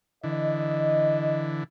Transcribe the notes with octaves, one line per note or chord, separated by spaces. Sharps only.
D3 E3 D#5